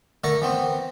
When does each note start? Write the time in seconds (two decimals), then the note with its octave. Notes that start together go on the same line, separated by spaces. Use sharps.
0.24 D3 A3 A4 A#4 C#6
0.42 E3 B3 C4